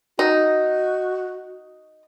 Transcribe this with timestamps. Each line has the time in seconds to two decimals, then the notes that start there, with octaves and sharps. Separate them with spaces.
0.19 D#4 F#4